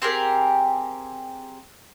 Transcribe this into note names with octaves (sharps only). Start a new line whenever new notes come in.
C4 G4 G#4 A#4